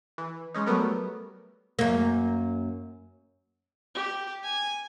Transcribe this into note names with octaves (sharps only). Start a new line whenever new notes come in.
E3
G#3 C#4 D#4
F#3 G3 A3 B3 A#4
F#2 A#3
G4
G#5